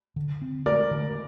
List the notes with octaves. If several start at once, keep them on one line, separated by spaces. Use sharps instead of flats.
D3
C4
A3 A#4 D5
D3